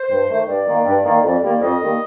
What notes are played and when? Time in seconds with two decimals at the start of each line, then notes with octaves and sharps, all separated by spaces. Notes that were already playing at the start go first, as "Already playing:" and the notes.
Already playing: C5
0.10 G2
0.29 D#3 A3
0.47 G2 D5
0.66 D#3 A#3
0.85 G2
1.04 D#3 A#3
1.23 F2
1.43 D#3 G3 A#3
1.61 F2 D#5
1.81 D#3 G3 A#3